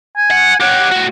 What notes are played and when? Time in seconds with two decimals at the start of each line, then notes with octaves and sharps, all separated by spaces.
0.17 G#5
0.30 F#5
0.60 G4 C#5 F#5
0.91 A2 F#4